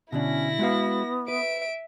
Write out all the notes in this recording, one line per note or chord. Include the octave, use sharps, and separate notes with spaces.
B2 D3 C#4 D4 E4 A#6
G#3 B3 F#4 F5
B4 E5 D7